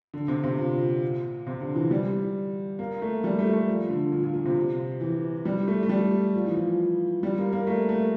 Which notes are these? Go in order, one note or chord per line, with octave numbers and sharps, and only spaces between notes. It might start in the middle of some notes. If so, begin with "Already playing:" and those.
D3
C3
C3
A#2
C3
D3
E3
G3
A#3
A3
G3
A3
A3
F3
D3
A#2
A#2
A#2
C3
E3
G3
A3
A3
G3
F3
E3
F3
G3
A#3
A#3
A3
A3